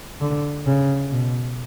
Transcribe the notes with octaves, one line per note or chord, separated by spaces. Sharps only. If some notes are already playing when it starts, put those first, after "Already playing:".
D3
C#3
B2